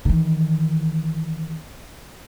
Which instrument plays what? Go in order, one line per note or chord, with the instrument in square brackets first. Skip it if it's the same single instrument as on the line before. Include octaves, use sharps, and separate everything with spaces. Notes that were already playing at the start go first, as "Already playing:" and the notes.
[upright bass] D#3 E3